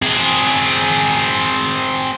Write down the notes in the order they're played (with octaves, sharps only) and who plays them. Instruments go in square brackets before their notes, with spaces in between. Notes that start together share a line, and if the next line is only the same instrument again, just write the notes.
[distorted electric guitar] C4 G#4